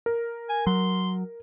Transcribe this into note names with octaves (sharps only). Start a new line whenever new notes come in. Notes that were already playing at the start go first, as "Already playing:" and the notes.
A#4
G#5
F#3 C6